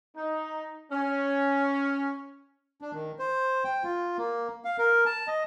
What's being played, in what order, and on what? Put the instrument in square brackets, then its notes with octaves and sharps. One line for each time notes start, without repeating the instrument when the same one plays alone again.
[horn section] D#4
C#4
[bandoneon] D4
D#3
C5
G5
F4
A#3
F5
A#4
A5
D#5